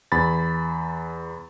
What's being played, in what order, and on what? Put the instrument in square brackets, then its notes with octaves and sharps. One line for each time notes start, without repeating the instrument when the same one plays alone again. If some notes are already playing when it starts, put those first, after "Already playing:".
[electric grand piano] E2 B5 A6